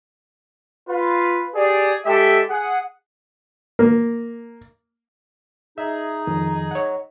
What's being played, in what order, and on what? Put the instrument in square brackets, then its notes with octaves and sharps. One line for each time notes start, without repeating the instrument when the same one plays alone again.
[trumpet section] F4 B4
G4 G#4 D5
G#3 G4 A4 E5
G#4 F#5
[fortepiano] A#3
[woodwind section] D#4 G#4 [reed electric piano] E5
[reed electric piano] F2 D#3
C#5 F#5